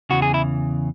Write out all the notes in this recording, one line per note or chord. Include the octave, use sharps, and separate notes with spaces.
E2 C#3 E3 F#4
G#4
E4